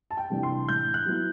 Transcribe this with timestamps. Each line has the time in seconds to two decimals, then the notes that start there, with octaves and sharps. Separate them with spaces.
0.11 A5
0.17 G5
0.30 C3 E3 A3 D4
0.43 C6
0.68 A2 G6
0.94 F#6
1.06 F#3 B3 E4